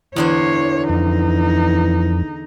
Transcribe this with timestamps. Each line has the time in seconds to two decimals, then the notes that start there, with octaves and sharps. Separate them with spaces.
0.16 E2 D3 E3 C5 C#5
0.89 F2 D#4